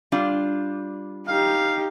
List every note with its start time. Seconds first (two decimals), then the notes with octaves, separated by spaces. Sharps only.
0.12 G3 D4 F4
1.28 D#4 G4 F5